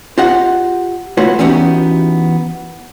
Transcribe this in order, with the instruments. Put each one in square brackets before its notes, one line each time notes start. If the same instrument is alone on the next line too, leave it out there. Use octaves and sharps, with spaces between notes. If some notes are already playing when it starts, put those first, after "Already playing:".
[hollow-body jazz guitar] F4 G4 D#5 F5 F#5
A3 F4 F#4 B4 C#5 F#5
E3 B3 C#4 D#4 F#4 G4